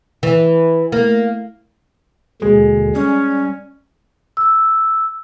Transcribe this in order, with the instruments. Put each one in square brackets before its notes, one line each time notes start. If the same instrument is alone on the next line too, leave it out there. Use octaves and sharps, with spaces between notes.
[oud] E3
A#3
[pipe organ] D#2 B2 D3 [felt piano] G#3
[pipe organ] G3 [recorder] C#4
[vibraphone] E6